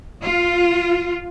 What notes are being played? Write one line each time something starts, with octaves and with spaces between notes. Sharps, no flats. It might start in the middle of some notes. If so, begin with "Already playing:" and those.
F4